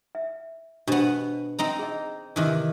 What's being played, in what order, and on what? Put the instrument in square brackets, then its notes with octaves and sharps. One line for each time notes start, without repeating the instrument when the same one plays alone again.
[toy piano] E5
[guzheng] B2 B3 [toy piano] D4 G4 C5
[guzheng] C4 D#4 A#5
[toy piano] G#4 D#5
[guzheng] C3 D#3 E3